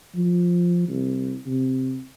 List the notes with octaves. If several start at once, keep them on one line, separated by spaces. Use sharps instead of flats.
F3
C2
C3